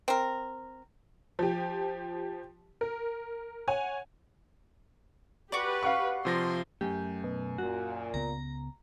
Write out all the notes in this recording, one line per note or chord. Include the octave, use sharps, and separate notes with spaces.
C4 A#4
F3 G4
A#4
C#5 F#5 G#5
F#4 G4 B4 D5
F5 F#5 C#6
C3 F3 C6 A#6
F#2 F#3 A3 G4
B2
A#2 F#4
C#2 C#3 B3 A#5